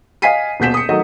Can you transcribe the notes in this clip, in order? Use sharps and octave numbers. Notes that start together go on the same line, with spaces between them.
D#5 F5 G#5 B6 C7 D#7
D#1 B2 G6 B6 E7
D#6 C#7
D#3 F#3 A3 D#5